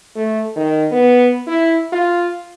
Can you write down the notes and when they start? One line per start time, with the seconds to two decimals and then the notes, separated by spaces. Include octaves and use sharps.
0.16 A3
0.56 D#3
0.92 B3
1.47 E4
1.93 F4